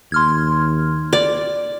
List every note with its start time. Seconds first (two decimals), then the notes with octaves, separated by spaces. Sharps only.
0.12 D#2 C6 F6 G#6
1.13 D5